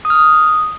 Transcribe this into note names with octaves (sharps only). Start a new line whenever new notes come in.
D#6
F6
D#6